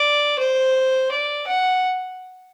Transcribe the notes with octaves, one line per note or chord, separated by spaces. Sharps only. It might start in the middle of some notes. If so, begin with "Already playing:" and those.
Already playing: D5
C5
D5
F#5